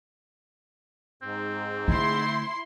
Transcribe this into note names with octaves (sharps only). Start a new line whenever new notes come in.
G#2 C4
D3 A3 E4 C6